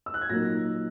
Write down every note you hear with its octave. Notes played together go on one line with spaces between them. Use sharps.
E6
F#6
G#6
A#2 F#3 A#3 D#4 A#6